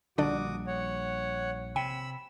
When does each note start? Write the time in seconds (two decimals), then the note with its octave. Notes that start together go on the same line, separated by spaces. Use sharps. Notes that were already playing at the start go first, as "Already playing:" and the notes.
0.18 A#1 D3 G3 D4 F#4 D5 D6 D#6
0.67 C#5 F#5
1.76 C3 G5 B5 E6